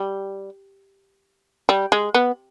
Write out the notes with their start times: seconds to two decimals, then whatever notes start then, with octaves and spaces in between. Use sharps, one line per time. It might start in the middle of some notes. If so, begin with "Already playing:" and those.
Already playing: G3
1.69 G3
1.92 G#3
2.14 B3